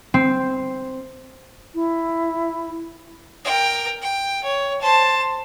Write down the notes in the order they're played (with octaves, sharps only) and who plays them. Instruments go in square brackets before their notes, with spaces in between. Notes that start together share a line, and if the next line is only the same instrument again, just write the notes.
[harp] C4
[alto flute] E4
[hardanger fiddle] A#4 G5
G5
C#5
C5 A5